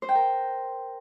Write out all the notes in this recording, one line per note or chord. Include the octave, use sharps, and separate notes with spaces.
C5
G5
A#4